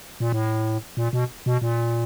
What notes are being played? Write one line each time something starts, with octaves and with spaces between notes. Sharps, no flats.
A#2
A2
A#2
B2
B2
A#2